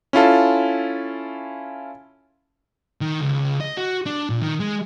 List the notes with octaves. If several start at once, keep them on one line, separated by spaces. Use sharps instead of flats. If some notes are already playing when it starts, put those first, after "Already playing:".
C#4 E4 F4 A4
D#3
C#2
D#5
F#4
D4
A#2
D#3
G#3